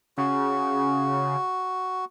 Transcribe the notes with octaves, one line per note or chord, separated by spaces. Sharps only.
C#3 F#4